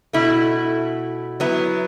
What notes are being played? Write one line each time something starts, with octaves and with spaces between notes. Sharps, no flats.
B2 A3 E4
F#3 B3 E4